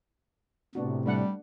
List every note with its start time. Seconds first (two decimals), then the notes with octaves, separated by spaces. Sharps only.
0.75 A2 C3 B3 D4 F#4
1.06 G3 A3 D4 F#5